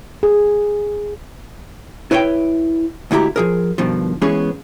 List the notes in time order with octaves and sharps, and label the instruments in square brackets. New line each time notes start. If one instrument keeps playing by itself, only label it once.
[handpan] G#4
[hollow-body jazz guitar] E4 B4 C#5 E5 G5
D2 G#2 E4 G4 A#5
F3 G#4 A#4
G2 B2 D#3 F3
E3 G#3 B3 C#4 G#4 C#5